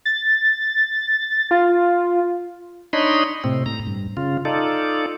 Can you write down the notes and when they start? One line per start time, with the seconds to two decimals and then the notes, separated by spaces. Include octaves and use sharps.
0.05 A6
1.51 F4
2.93 D4 D#4 C#5 D#5 B5 C6
3.44 A2 C3 C4
3.66 A2 A#5
3.87 G2
4.17 C#3 F4
4.45 D#4 F4 A4 D5